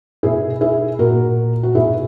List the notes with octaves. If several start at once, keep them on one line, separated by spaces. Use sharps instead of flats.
B2 E4 G#4
E4 G#4
A#2 F#4 A#4
F#4
B2 E4 G#4